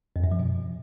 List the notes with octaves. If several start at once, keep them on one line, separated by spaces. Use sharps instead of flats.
F2
F#2
F3
B2